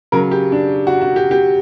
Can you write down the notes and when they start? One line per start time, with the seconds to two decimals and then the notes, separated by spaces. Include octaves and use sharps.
0.12 C#3 F#3 A#4
0.31 G4
0.52 D4
0.87 F#4
1.01 F#4
1.16 G4
1.31 G4